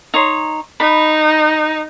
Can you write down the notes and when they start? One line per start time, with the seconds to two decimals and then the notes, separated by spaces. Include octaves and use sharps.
0.14 D#4 C#5 C6
0.80 D#4 B5